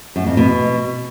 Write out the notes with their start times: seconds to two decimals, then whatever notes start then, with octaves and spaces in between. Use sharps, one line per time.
0.16 F#2
0.26 F2
0.37 B2